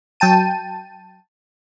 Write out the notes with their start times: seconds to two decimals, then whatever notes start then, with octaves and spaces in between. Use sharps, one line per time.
0.20 F#3 G5 A5 D#7